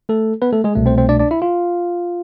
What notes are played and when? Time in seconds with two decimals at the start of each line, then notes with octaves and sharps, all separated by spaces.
0.09 A3 A4
0.42 B3 B4
0.53 A3 A4
0.64 G#3 G#4
0.75 C2 B2 A3
0.86 C4 C5
0.98 C4 C5
1.09 D4 D5
1.19 D4 D5
1.31 E4 E5
1.42 F4 F5